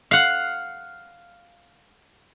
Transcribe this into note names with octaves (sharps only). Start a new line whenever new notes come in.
F5 F#5